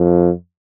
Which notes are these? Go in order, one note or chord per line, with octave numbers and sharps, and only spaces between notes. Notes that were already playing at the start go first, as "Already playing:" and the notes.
Already playing: F2